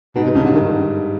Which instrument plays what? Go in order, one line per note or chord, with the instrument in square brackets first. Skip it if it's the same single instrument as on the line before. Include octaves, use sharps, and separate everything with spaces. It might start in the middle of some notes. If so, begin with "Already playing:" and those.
[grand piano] G#2 [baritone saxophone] B2
[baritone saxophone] C3
[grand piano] G2 [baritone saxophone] C#3
[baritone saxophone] D3
D#3